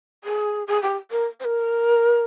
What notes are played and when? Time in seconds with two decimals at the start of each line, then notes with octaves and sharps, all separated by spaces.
0.24 G#4
0.67 G#4
0.82 G4
1.10 A#4
1.39 C5
1.44 A#4